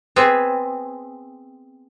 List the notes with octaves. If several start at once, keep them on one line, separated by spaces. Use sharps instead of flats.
B3 C4 G#4